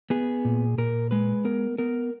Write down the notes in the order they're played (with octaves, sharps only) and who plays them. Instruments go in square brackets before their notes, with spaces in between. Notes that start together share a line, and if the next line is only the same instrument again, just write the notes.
[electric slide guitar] B3 G#4
A#2
A#2 A#4
G#3 B4
B3 A#4
B3 A#4